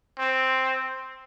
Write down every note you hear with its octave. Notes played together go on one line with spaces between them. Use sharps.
C4